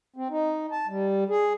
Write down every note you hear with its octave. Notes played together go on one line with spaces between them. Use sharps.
C4
D#4
A5
G3
G#4